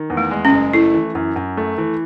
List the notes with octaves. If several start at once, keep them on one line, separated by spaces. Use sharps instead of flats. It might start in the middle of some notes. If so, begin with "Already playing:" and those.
Already playing: D#3
E2
A3
G#3
C#4
F#1
A3 E4
E3
F#2
F#2
A3
E3